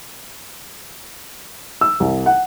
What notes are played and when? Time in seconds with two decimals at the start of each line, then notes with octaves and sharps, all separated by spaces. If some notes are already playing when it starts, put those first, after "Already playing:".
1.81 E6
2.00 C2
2.26 F#5